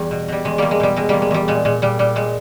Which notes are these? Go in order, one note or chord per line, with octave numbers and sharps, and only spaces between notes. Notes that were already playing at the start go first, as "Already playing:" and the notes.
Already playing: E2 G3
B2
B2 G3
E2 G#3
E2 G3 A#3
G#3
B2 G3
B2 G#3
E2 G3 A#3
G#3
E2 G3
A#2 G#3
A#2 G#3
A#2 G3
A#2 G3
A#2 G#3